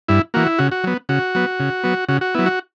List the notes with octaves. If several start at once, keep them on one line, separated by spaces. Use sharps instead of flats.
G2 E4
E3 A#3 F#4
E4
C#3 F#4
F#4
F#3 B3
C#3 F#4
F#3 B3
C#3
F#3 B3
C#3 F#4
F#4
F#3 B3 E4
F#4